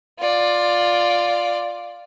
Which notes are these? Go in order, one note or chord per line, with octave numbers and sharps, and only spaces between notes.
F4 D5